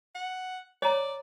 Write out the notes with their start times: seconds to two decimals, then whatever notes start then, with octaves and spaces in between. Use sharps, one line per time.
0.15 F#5
0.82 C#5 D5 A#5